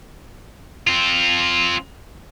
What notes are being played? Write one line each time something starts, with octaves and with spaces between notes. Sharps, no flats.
C4 F4